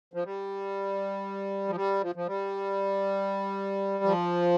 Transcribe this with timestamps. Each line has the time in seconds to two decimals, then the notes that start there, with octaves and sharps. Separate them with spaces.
0.14 F3
0.24 G3
1.68 F3
1.75 G3
2.02 F3
2.15 F3
2.27 G3
4.04 F3